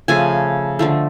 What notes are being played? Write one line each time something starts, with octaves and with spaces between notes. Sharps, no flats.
C#3 F3 A3 G#5
D3 F3 A3